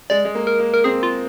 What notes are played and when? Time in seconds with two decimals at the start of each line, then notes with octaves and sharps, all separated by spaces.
0.10 G#3 D5
0.25 G#3
0.35 A#3
0.47 A#4
0.59 A#3
0.74 A#4
0.84 C4 G#4
1.03 F4